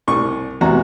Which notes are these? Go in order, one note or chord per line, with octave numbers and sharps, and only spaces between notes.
C2 C#6
E2 C3 F#4 A#5